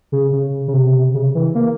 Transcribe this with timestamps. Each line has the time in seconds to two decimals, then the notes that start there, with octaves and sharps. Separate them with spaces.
0.12 C#3
0.32 C#3
0.68 C#3
0.73 C3
1.14 C#3
1.35 E3
1.55 A#3